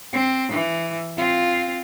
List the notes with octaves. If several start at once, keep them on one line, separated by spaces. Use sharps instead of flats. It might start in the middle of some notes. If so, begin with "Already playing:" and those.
C4
E3
C4 F4